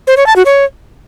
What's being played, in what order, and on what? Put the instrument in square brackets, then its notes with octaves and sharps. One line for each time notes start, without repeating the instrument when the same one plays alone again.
[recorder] C5
C#5
A5
F#4
C#5